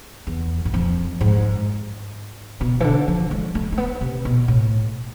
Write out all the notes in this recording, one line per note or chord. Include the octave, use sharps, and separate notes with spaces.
E2
G#2
F2
G#2
B2
E3
D3
F3
G#3
A3
A3
B3
C3
B2
A2